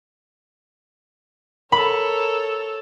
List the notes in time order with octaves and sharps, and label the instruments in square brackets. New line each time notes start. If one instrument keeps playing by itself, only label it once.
[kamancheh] A4 C#5 [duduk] A#4 [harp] B5